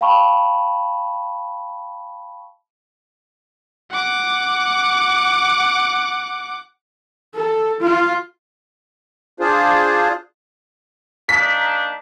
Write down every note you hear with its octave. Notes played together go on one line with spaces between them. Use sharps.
F5 G5 A5 B5 C#6
F#5 D6
A4
F4
D4 F4 G#4 C5
A#3 D4 D#4 B6